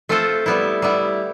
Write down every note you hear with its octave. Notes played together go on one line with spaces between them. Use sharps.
A3 C4 F4 A4 C5
G3 B3 E4
G3 B3 E4